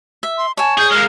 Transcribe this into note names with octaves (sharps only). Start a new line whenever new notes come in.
E5
C6
C#5 G#5 A5
G#4 G6
G#3 A#3 F6